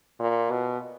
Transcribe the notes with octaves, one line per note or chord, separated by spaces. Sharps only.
A#2
B2